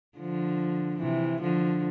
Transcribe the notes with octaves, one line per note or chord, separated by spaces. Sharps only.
D3 F3
C3 E3
D3 F3